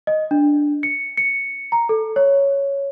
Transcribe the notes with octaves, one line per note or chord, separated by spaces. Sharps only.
D#5
D4
C#7
C#7
A#5
A4
C#5